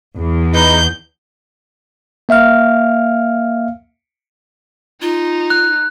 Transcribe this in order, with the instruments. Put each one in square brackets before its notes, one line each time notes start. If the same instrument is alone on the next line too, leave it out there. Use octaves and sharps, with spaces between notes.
[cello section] E2
[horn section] D#4 B4 [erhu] G6
[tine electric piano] A#3 E5 F5 F6
[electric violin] D#4 [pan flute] F4
[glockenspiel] F#6